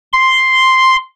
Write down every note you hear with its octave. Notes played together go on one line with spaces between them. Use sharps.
C6